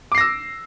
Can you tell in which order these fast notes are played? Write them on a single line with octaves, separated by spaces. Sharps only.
D6 C7 A#6 E6